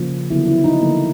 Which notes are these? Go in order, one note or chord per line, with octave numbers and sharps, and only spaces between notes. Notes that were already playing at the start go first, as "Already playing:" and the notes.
Already playing: C#3 F3 A#3
D3 F#3 B3 E4
E4
D#4
D3 F3 A#3